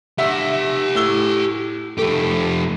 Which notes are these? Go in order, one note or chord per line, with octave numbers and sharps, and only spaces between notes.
G4 E5 F#5
A2 E6 G7
F2 A3 G4